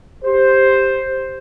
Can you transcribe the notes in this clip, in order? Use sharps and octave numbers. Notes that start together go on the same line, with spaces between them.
G4 C5